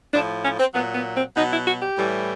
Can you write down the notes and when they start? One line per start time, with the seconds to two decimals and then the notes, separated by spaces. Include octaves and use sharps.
0.13 A2 F3 D4
0.43 C#4
0.59 C4
0.74 A#2 F#3 B3
0.94 B3
1.16 C4
1.35 B2 F#3 D#4
1.52 E4
1.67 F#4
1.82 G4
1.98 A2 E3 G3